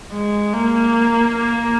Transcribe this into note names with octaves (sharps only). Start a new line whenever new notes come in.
G#3
A#3